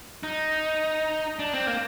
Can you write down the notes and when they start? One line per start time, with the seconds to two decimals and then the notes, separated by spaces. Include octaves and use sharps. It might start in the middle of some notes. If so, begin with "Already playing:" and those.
0.23 D#4
1.39 D4
1.54 C4
1.67 A#3